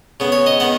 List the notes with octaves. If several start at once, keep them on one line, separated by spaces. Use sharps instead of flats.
C#3 B3
C#5
D#5
D#3 B3 F#5